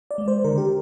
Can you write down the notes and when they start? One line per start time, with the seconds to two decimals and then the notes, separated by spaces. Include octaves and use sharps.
0.11 D5
0.18 G#3
0.28 C5
0.44 D3 A#4
0.58 G4